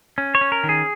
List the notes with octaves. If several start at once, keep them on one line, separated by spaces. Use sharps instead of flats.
C#4
C#5
C#4
A#4
D#3
G#4